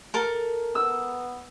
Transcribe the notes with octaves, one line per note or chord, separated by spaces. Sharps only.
A4 A#4
B3 E6